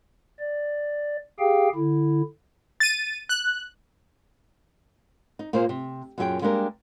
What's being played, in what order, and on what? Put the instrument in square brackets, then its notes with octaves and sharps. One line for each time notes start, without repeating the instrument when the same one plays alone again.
[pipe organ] D5
G4 G#4 F5 G5
D3 E4
[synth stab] A6 D#7
F#6
[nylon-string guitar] D#4
A#2 A#3 G#4 C5
C3
F#2 A#2 F#3 F#4 G#4 G5
G3 G#3 A#3 D4 G4 A#4